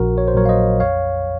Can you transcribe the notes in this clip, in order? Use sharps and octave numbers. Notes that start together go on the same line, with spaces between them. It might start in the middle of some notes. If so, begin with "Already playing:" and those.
Already playing: A#1 F#4 A#4
C#5
C5
A#2 F#3 A#4 C#5
F5
C5 D#5
F2 C#5 F5